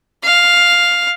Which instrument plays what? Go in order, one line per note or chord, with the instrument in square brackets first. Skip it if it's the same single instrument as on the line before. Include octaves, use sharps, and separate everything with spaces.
[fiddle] F5